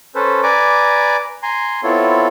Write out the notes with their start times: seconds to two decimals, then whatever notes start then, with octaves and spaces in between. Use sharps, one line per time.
0.15 C#4 A4 B4 C5
0.43 B4 D5 G#5 A#5 D6
1.43 G#5 A#5 C6
1.83 B3 C4 E4 F4 A4 C#5